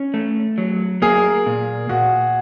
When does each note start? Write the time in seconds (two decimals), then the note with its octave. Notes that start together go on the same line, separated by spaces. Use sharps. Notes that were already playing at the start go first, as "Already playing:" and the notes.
Already playing: C#4
0.14 A3
0.58 F#3
1.02 A#3 G#4
1.46 A#2
1.89 A#2 F#4